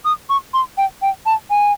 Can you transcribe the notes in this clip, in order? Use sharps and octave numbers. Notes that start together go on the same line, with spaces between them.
D#6
C#6
C6
G5
G5
A5
G#5